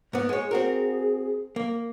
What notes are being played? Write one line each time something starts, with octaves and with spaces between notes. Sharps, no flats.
G#2 B3
G#3 G#4 C#5
C4 F#4 A#4
A#3